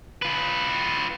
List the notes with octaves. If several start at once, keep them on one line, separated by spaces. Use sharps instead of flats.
F4 B4